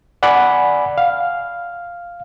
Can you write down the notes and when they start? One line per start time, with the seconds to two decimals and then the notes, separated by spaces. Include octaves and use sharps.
0.23 D5 F#5 G#5 B5
0.98 F5